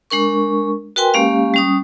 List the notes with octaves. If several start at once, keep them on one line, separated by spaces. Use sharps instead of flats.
G#3 D4 A#4 C#6
F#4 A#4 B4 G5 G#5 C6
G#3 A#3 C#4 G4 F5
G3 C#4 D#6